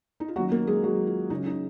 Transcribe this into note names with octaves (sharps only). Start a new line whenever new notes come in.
D#4
F4
D#3 F#3 A#3 C#4 F#4
A#3 A#4
G#3 G#4
F#3 F#4
F4
C#3 F#3 C#4 D#4
D#4